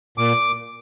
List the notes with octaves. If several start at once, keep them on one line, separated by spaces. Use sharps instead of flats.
A#2 D6